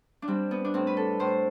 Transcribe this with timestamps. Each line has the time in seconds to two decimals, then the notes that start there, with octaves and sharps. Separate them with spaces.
0.22 D4
0.28 G3 C4
0.51 B3
0.65 D4
0.74 A2 C4
0.87 B4
0.97 A4
1.20 A2 C5